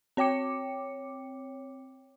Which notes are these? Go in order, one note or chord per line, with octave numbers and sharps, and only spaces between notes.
C4 C#5 G5 D6 C#7